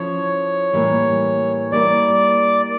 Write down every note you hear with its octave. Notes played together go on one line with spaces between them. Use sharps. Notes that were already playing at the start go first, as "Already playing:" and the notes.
Already playing: F3 C#4 E4 A4 C#5
A2 E3 G3 A#3
G3 A#3 E4 D5